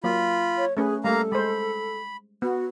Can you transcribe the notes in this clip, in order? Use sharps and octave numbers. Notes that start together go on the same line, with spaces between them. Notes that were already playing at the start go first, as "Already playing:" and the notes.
F#3 A#3 F4 B5
C#5
A3 C#4 G#4 B4
G3 A3 A#3 A4 F5 A#5
G#3 C5 B5
B3 F#4